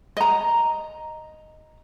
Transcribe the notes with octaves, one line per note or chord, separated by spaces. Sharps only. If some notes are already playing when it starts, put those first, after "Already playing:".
D#5 A#5